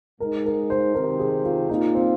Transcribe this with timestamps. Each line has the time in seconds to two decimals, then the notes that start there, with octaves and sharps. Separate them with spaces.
0.20 G#2 G#3 D#4 A#4
0.46 A#4
0.70 C5
0.94 C3 D#3 C4 A#4
1.19 G#4
1.44 F4
1.69 A#2 A#3 D#4 F4
1.95 C4